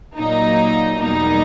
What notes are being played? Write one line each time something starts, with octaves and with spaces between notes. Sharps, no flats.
A#2 F#3 A#3 D#4
E2 B2 G3 A#3 D#4